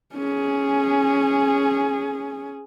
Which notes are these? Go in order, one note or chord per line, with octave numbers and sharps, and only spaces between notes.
C#4 G#4